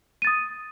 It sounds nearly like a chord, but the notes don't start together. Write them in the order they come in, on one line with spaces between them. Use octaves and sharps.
D#7 A6 D#6